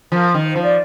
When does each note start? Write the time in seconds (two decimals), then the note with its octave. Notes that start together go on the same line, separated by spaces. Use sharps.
0.12 F3 A#4
0.34 D#3
0.45 C5
0.56 F3
0.62 D5